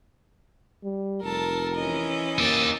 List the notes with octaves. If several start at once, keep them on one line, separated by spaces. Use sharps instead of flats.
G3
F1 A4 A#4 A5
E3 C#4 D#5
A#3 D#4 G4 E6 A6